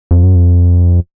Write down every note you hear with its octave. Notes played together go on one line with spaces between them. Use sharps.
F2
F#2
F2